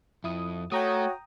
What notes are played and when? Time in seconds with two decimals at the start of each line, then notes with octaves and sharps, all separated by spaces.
0.24 F2 E4 D#6
0.72 A3 F#4 C#5 G5 A#5 D#6